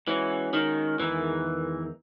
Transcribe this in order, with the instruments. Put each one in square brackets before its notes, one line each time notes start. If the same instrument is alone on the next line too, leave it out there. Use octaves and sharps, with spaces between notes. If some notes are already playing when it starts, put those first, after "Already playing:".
[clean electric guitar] E3 [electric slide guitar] G#3 C#4 F#4 C#5
[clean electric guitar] D#3
[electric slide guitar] E2 D#3 G#3 D#4 A#4 [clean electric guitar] E3